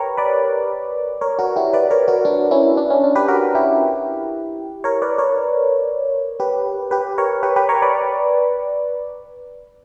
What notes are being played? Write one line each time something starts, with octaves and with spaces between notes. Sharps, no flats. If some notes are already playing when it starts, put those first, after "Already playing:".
Already playing: G4 A#4 B4 C#5
B4 D5
A#4 C#5
F#4 A#4
E4 G4
B4 D5
A#4 C#5
F#4 A#4
D4 F#4
C#4 E4
D4
C#4
D4
G4 B4
F#4 A#4
E4 G4
A#4 C#5
B4 D5
A#4 C#5
G4 B4
G4 B4
A#4 C#5
G4 B4
G4 B4
A#4 C#5
B4 D5